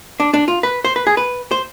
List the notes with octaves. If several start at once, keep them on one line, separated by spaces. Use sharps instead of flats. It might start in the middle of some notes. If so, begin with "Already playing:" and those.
D4
D4
F4
B4
C5
B4
G#4
B4
C5